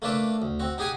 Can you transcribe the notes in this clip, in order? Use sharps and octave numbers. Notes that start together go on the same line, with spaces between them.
A3 A#3 D4 B4 D5 E5
D2
C4 F#4
D#4 G4 G#4 F#5 G#5 D#6